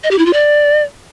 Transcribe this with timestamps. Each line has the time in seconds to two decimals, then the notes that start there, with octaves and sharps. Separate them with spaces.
0.04 D#5
0.11 G4
0.18 E4
0.26 F4
0.33 D5